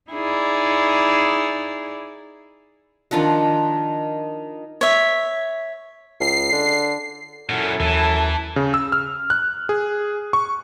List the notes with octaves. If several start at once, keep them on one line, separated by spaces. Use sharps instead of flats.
D#4 E4 G#4 D5
D#3 F3 D4 F#5
C#5 E5
C#2 C7
D3
F#2 A#2 C#4 E4 A4 F#5
D#2 E3 A5
C#3
E6
F6
F#6
G#4
C#6